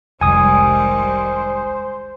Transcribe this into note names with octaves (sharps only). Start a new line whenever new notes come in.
F1 C2 D#3 G3 G#3 C5 G#5 D#6